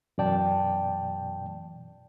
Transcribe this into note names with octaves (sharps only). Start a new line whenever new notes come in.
F#2 B2 E3 D5 G5 A5